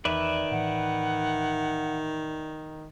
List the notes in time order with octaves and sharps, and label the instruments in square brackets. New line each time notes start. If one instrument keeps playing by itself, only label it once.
[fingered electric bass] E2 [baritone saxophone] D#3 [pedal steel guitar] B4 D5 E5
[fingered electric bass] A2 E3 [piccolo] F#5